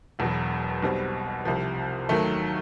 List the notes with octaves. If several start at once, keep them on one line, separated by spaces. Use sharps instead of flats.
E1 E2 B2 F#3
B1 B2 G3 C4
C2 C3 F3
D#2 D#3 F#3 A3